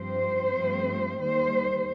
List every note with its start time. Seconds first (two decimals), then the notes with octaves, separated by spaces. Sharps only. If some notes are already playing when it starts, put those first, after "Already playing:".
Already playing: G2 F3 C4 C5
0.54 G2 F3 A3 C4
1.20 D#2 D#3 G3 C5